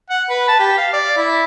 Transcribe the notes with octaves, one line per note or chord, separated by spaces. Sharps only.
F#5
B4
A5
G4
F5
D5
E4